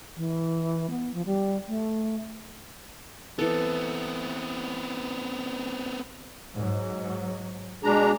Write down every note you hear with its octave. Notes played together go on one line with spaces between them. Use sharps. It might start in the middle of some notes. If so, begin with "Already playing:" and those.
E3
B3
F3
G3
A3
E3 B3 C4 A4
G#2 F#3
B2 G#3 D4 G#4 A#5